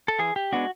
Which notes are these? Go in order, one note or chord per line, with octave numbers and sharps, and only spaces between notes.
A4
E3 G#4
G4
G#3 B3 D4 F#4